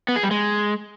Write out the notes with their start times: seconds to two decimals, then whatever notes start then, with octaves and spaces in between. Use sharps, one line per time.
0.08 B3
0.16 G#4
0.23 G3
0.31 G#3